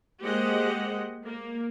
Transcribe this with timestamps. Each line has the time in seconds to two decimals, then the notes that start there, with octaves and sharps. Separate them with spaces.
0.23 G#3 A#3 G4 C5 D#5 F#5
1.26 A#3